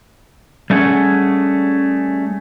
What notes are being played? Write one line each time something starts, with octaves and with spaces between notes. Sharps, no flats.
G3 A3 C#4 G#4 F#5